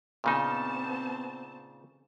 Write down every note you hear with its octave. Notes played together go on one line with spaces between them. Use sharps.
A#2 C#3 B3 C4 D#4 A5